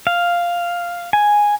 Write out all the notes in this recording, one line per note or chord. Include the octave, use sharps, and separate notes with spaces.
F5
G#5